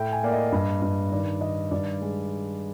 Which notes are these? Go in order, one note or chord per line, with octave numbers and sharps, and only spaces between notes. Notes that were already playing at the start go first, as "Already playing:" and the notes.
Already playing: A2 A3 G5
G#5
A#3 D5
D#5
G2
G2
D#3 D5
D#3 D#5
G2 D5
G#3